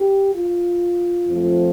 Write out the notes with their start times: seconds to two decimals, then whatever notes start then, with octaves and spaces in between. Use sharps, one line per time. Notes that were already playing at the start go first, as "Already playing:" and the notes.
Already playing: G4
0.34 F4
1.26 F2 F3 A3